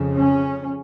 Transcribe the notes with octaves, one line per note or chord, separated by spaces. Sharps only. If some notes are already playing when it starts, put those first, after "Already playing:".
Already playing: F2 C#3
C#4